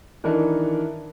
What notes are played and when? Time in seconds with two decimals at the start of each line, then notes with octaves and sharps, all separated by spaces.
0.24 D#3 E3 D4 D#4 A4 A#4